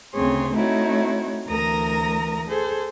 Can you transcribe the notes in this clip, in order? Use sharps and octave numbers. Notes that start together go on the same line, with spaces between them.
D2 C#3 C4 G#4 C#5 C6
A3 C4 D#4 E4 F#4 C#5
D2 E3 A#4 A#5 D#6 A#6
G#4 A4 C5